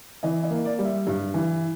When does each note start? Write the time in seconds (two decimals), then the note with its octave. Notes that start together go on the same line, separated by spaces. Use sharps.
0.23 E3 D#5
0.43 D#5
0.50 A#3
0.65 D5
0.79 G3
0.85 E5
1.07 G2
1.34 E3